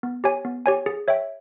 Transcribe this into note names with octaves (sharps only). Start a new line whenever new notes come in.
B3
G4 C#5 G#5
B3
G4 C#5 G#5
G#4
C#5 E5 G5